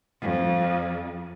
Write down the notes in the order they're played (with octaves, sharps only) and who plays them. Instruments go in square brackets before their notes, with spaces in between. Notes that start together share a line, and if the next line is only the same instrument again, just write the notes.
[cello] F2